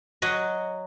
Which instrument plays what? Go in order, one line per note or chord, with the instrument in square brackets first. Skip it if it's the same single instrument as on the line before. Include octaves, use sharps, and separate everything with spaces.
[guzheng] F#3 F#4 D#5